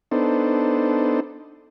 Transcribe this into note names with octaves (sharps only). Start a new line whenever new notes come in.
B3 D4 D#4 A4 C5